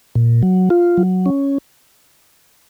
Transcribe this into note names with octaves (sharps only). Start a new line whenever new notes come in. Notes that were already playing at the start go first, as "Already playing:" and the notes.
A#2
F#3
F4
F#3
C#4